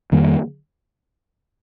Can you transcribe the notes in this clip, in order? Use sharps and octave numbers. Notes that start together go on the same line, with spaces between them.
F2 D#3 G3 A#3